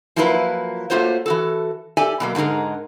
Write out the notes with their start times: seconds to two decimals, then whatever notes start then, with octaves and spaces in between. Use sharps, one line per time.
0.16 F3 F#3 A#3 E4 F4 B4
0.90 A3 A#3 F4 F#4 C5 C#5
1.26 E3 F#4 A4
1.97 G4 A4 D5 E5 G#5
2.20 B2 F#3 A#3
2.35 G#2 D3 D#4 G#4 A#4